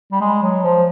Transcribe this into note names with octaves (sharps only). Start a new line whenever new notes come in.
G3
G#3
F#3
F3